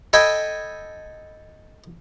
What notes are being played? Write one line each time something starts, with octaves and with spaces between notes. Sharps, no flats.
A4 D#5 G5 G#5 B5